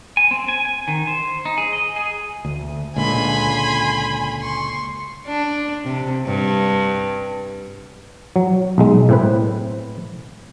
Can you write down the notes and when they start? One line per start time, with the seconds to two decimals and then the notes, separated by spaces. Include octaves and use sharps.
0.17 G#5
0.31 C4
0.48 G#5
0.65 G#5
0.88 D#3
1.07 C5
1.45 D#4
1.58 G#4
1.73 D#5
1.96 G#4
2.45 D2
2.96 C#2 A#2 D3 G#5 B5 C6
4.39 C6 C#6
5.27 D4
5.85 C3
6.26 G2
8.36 F#3
8.78 B1 G#3
9.09 A2 C4 B4